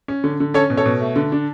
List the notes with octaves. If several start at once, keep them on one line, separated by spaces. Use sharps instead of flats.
C#4
D3
D3
C#4 A4 C#5
B2
A4 C#5
B2
A3
D3
D4